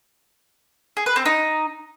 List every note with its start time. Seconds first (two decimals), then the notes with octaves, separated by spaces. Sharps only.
0.97 G#4
1.06 B4
1.16 C4
1.25 D#4